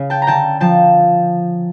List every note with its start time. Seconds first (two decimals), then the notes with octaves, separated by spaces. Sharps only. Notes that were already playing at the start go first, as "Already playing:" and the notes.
Already playing: C#3
0.10 G5 A5
0.22 A#5
0.27 D3 G5 A5
0.60 F3 G5 A5